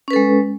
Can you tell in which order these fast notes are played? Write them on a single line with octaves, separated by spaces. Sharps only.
C#4 B4 A4 G#3